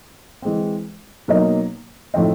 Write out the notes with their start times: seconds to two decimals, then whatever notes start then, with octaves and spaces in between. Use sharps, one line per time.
0.42 E3 G#3 C4
1.28 B2 F#3 A#3 D#4
2.14 A2 F3 A3 C4 D#4